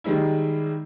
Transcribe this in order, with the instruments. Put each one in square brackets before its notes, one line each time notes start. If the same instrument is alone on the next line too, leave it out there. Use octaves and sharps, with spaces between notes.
[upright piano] D#3 G3 G#3 D#4 E4